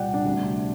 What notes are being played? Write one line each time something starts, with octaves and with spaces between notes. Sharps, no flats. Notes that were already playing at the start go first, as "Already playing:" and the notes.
Already playing: C2 A#2 G3 D5 F#5 G5
D4
D2 C3 G3